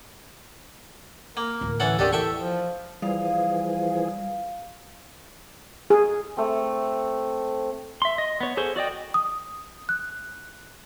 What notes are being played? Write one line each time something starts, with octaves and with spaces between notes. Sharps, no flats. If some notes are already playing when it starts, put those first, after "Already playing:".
A#3 A#4
A1 D2
E3 C#4 A4 F#5
D#2 D#3 D4 G4 A4
E3 A4 E5 G5 C#6
F3
E3 F3 G3 G#4 F5
G#4
A3 C4
E5 C6
D#5
B3 C#5
G#4 A4 C5 C#5
F#4 D5 D#5 G5
D#6
F#6